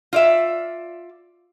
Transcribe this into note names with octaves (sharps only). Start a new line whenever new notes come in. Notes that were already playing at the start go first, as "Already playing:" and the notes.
F4 D5 E5